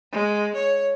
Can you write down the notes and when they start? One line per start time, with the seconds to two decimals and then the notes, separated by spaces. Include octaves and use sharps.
0.12 G#3
0.56 C#5